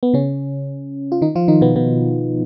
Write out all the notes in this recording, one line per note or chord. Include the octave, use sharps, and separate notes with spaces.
B3
C#3 C#4
F4
D#3 D#4
F3 F4
D#3 D#4
B2 B3
B2 B3